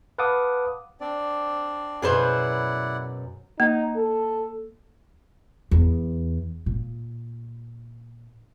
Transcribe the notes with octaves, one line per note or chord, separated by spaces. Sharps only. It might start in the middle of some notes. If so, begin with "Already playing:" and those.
B4 F5 F#5 A5 D6 D#6
C4 D4 D5
F#2 B2 E4 G#4 B4 C5 D5 F#5
A#3 D#4
A4
E2
A#2